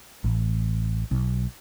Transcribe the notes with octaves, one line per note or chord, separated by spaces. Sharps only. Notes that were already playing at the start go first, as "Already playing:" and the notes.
A1
B1